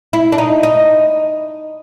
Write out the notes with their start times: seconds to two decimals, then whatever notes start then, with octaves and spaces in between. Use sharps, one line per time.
0.13 E4
0.32 D4
0.38 D#4
0.63 D#4